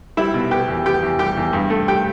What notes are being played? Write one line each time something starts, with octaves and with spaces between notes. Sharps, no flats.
G3 E4 E5
B2
B3 G4 G5
E2
B3 G4 G5
E2
G3 G4 G5
E2
G2
A3
G4 G5